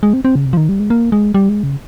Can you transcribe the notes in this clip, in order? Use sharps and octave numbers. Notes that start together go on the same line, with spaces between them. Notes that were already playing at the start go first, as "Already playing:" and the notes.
G#3
C4
C4
C#3
C3
F3
D#3
G3
G#3
A#3
G#3
G3
G#3
C#3